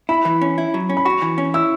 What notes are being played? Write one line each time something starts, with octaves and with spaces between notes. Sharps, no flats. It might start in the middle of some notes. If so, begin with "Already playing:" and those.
E4 B5
E3
C#4
E4
F#3
C#4
B5
F#4 C#6
E3
C#4
E4 E6